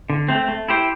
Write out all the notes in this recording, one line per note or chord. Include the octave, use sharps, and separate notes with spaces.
D3
A3 C4
A3
E4 G4 C5